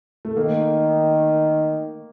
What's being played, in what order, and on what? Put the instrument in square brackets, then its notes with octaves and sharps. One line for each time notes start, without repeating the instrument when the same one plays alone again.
[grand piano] A3
[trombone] D#3 [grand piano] A#3